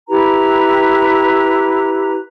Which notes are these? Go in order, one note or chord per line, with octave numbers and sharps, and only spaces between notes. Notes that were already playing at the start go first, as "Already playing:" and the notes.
E4 G4 B4 A#5